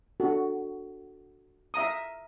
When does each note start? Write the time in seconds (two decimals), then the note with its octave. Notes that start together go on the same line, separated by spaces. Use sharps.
0.20 D4 F#4 A4
1.74 E5 F5 A#5 D#6